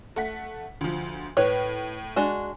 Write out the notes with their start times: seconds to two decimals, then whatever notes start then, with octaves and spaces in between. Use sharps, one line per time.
0.16 A3 F#5 B6
0.81 D2 F3
1.37 A2 B4 C#5
2.16 G#3 D4 F#4